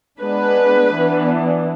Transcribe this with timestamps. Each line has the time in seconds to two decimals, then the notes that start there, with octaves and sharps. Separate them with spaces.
0.20 G#3 B3 D4 B4
0.94 E3 B3 D4